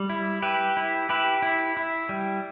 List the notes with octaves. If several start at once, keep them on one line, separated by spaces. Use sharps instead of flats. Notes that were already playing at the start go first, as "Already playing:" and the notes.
Already playing: G3
E4
E4 G4 B4
E4
E4 G4 B4
E4
E4
G3